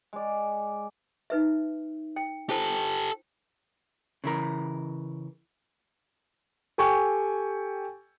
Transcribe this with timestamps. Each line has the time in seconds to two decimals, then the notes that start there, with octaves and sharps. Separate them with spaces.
0.13 G#3 D5
1.30 D#4 B4 E5
2.16 G5
2.49 F4 G4 A4 C5 A5
4.24 C#3 E3 A#4
6.78 G4 A4 G5 G#5 C#6